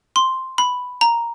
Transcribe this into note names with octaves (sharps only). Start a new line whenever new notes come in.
C6
B5
A#5